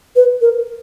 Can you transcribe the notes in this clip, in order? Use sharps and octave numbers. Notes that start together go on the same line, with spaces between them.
B4
A#4